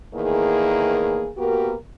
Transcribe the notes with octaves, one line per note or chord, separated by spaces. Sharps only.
E2 A2 D#3 A#3 G#4
A#3 B3 F#4 G4 A#4